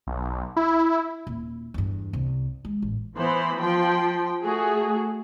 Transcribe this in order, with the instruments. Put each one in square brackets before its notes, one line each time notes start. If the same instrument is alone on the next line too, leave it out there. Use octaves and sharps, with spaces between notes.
[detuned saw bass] B1
E4
[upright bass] D#1
E2 G2
C2
G#3
A1
[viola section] E3 B3 C5 B5
F3 G5 C6
A3 F#4 G#4